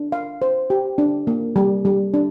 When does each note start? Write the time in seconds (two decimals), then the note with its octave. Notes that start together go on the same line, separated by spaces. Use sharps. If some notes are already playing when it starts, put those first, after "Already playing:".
Already playing: D4
0.12 F5
0.42 C5
0.70 G4
0.98 D4
1.27 A#3
1.56 G3
1.85 G3
2.14 D4